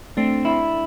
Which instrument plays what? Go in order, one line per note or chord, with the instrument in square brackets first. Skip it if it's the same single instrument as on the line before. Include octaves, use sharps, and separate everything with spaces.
[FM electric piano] A3 D4 [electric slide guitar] C4
[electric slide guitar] E4